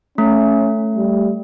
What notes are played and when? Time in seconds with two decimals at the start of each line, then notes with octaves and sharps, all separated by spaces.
0.18 A3 C#4
0.97 G3